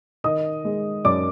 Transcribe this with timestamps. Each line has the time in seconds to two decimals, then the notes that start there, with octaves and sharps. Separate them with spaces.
0.24 D#3 D#5 D#6
0.65 G#3
1.05 F#2 D5 D6